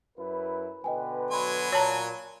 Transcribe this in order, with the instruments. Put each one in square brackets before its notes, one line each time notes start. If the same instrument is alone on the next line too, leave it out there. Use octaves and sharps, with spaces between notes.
[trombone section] F#2 E4 B4
[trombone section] B2 D3 B4 [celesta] D#5 G5 G#5
[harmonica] F#3 G#5 [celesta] B5 C6
[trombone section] A#2 [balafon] C#5 A5 A#5